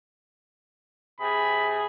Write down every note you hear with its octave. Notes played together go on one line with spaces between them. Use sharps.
C3 G#4 B5